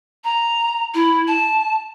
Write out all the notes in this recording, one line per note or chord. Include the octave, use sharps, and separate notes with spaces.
A#5
E4
A5